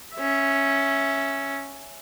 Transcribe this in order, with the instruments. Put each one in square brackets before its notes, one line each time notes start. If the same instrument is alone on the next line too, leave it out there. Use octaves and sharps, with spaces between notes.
[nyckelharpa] C#4 E5